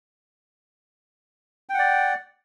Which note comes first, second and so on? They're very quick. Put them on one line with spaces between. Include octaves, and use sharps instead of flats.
G5 F#5 D5